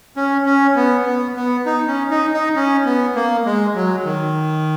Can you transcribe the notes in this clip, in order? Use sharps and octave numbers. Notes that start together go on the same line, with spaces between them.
C#4
C#4
B3
B3
B3
D#4
C#4
D#4
D#4
C#4
B3
A#3
G#3
F#3
D#3